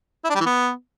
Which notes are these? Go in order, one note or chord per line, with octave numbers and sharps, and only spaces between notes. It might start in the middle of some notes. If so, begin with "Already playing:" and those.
E4
D4
G3
E3
B3